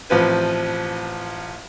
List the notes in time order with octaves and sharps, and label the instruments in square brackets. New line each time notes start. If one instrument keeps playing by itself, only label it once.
[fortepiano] A1 F3 C4 B4